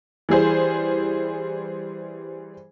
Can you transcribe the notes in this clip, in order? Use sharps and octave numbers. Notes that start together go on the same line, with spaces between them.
E3 G3 G#4 C5